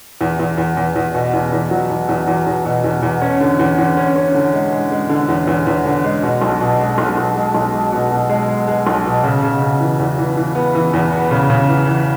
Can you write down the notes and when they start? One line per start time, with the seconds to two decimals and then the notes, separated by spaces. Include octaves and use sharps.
0.21 E2
0.40 E2
0.58 E2
0.77 E2
0.96 E2
1.15 B2
1.33 E2
1.52 E2
1.71 F#3
1.90 E2
2.09 E2
2.28 E2
2.46 E2
2.65 B2
2.84 E2
3.03 E2
3.22 C#4
3.40 D3
3.59 E2
3.78 E2
3.97 C#4
4.16 C#4
4.34 D3
4.54 G#3
4.72 G#3
4.91 G#3
5.09 D3
5.28 E2
5.47 E2
5.67 E2
5.85 D3
6.04 G#3
6.23 B2
6.42 B1
6.61 B2
6.79 G#3
6.98 B1
7.17 B1
7.36 G#3
7.55 B1
7.73 G#3
7.92 B2
8.11 B2
8.29 G#3
8.49 G#3
8.68 G#3
8.87 B1
9.05 B2
9.24 C#3
9.43 C#3
9.62 C#3
9.80 E3
9.99 E2
10.18 E3
10.37 E3
10.55 B3
10.75 E3
10.93 E2
11.12 B3
11.31 C#3
11.50 C#3
11.68 E3
11.87 E3